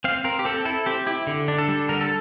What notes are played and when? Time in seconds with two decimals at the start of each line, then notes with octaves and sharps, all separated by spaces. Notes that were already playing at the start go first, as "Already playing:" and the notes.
0.04 C4 F5
0.24 C4 A#4
0.39 G4
0.45 C4 A4
0.65 E4 A4
0.86 C4 G4
1.07 E4 G4
1.27 D3
1.48 D4
1.58 A4
1.68 G3
1.89 D3 A#4
2.01 A4